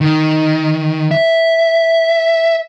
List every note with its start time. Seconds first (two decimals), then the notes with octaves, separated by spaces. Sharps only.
0.01 D#3
1.11 E5